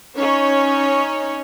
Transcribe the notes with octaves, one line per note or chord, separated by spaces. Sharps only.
C#4 D#4 C#5